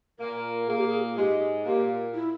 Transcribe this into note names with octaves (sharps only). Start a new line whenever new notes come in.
A#2 A#3 A#4
A#2 A#3 G#4
G4
G#4
G#2 G#3 G4
A#2 A#3 G4
E4